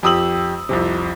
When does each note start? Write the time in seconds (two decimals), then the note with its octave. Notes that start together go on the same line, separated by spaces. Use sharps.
0.03 F2 G4 D#6 E6 F#7
0.69 C2 F2 C3